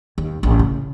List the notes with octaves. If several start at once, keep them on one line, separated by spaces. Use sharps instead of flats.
D#2
A1
C#3